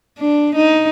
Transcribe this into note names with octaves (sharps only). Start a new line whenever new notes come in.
D4
D#4